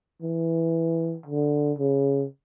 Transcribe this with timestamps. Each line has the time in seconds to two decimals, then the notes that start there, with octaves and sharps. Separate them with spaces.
0.22 E3
1.26 D3
1.79 C#3